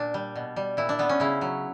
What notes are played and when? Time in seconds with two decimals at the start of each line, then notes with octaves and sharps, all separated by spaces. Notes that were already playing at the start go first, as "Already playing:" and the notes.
Already playing: A#2 D4
0.14 G3
0.36 B2
0.56 G3
0.77 A#2 E4
0.89 D4
0.99 G3 B3
1.09 C#4
1.20 C#3 E4
1.41 F#3